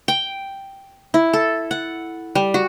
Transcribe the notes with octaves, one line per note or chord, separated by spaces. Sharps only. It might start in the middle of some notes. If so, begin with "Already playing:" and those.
G5
E4
A4
F#5
G3
F#4